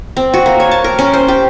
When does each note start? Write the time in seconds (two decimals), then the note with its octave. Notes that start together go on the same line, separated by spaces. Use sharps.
0.17 C4
0.34 F#4
0.46 A#3
0.60 C#5
0.71 A5
0.84 A#4
0.99 C#4
1.13 C5
1.28 G4